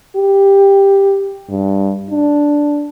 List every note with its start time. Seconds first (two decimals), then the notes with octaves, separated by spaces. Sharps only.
0.16 G4
1.49 G2
2.11 D4